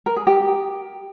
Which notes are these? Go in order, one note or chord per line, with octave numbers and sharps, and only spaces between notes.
A#4
G#4
G4